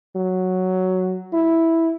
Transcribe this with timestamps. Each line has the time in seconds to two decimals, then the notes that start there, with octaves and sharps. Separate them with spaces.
0.16 F#3
1.33 E4